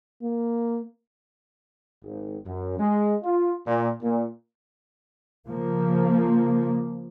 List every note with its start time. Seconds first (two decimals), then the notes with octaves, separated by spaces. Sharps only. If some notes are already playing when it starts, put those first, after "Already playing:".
0.22 A#3
2.04 G#1
2.46 F#2
2.79 G#3
3.24 F4
3.67 A#2
4.02 A#2
5.48 C#3 F3 A#3